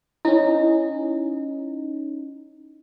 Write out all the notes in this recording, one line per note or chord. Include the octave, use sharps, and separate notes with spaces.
C#4 D#4 E4